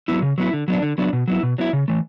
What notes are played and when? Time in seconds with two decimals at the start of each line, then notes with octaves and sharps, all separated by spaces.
0.08 F#3 B3 E4
0.22 C#3
0.38 F#3 B3 E4
0.53 D3
0.68 F#3 B3 D4
0.82 D3
0.98 F#3 B3 D4
1.13 B2
1.28 F#3 B3 E4
1.43 B2
1.58 F#3 B3 E4
1.73 C#3
1.88 E3 A3